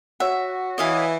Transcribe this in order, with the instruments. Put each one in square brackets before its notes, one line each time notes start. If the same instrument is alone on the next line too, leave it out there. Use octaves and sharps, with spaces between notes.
[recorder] F#4 [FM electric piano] C#5 F#5 [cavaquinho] E5
[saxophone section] E3 [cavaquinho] D#5 F5 G#5